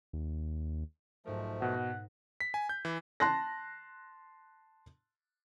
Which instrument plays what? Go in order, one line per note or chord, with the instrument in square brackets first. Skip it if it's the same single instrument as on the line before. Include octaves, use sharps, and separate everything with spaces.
[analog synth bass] D#2
[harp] B1 G#2 A#4 [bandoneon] F3 A3
[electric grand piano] B2 [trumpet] F#5 [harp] A#6
[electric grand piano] B6
G#5
G6
E3
[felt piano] A5 C6 F#6 A#6